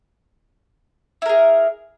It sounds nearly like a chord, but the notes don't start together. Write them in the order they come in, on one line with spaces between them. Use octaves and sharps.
E4 A#4 G#4